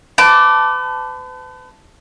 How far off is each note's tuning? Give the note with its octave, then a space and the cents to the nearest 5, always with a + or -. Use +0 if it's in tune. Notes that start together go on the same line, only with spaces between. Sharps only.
B4 +40 A5 +0 D6 -5